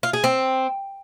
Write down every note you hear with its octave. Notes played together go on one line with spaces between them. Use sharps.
F4
G#4
C4